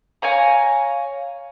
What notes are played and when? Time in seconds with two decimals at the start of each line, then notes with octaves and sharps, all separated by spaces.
0.22 C#5 F5 G#5 A#5